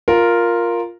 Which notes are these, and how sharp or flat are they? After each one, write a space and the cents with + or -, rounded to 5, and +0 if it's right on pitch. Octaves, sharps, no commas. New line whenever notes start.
F4 +0 A#4 +0